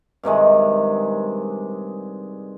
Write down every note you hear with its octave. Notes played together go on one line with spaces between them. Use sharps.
G2 C3 D#3 G#3